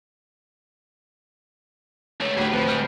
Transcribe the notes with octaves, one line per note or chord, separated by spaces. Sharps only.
C#2 A3 C#5
D2 A2 G4 G#4 B4
F3 C4 B4 C5
G3 G#3 F6